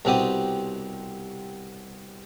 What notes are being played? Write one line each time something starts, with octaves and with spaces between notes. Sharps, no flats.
C2 B2 C4 G4 D#6